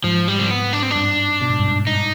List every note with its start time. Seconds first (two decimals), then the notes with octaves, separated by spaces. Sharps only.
0.04 G#2 F3
0.28 G3
0.39 C4
0.51 B3
0.73 D4
0.83 C4
0.91 D4
0.96 G2
1.42 B2
1.50 G#2
1.59 G2
1.68 G#2
1.87 G2 D#4